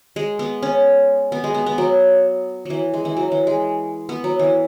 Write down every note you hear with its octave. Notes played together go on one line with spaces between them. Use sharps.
G#3
B3
C#4
B3
G#3
B3
B3
F#3
E3 F#3
G#3
E3
F#3
E3
G#3
B3
F#3
E3